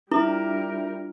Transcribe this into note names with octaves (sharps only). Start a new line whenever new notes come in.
G3 D4 E4 F4 A#4 E5